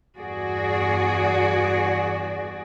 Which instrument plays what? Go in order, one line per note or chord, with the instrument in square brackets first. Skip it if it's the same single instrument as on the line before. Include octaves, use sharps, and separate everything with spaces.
[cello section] E2 G2 F#4 G#4 D5